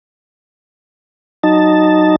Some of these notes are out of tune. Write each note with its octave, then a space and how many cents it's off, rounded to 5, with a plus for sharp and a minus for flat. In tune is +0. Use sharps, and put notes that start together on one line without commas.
F#3 +10 D#4 -5 A5 +0